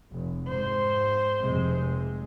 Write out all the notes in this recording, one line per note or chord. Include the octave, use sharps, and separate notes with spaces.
F1
G#2 C5
F1 C3 G#3